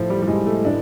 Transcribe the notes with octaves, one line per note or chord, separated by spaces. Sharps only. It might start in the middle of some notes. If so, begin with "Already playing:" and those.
Already playing: A2 F3
G3
G3
A2 F3 G#3
A3
A2 E3 D4